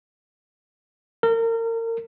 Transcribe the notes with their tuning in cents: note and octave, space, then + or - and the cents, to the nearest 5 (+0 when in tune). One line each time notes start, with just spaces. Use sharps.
A#4 -30